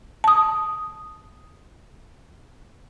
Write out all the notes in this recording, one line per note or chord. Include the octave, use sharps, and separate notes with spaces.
A5 D#6